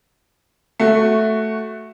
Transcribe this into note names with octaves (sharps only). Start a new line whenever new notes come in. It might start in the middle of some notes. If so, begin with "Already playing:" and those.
A3 F#4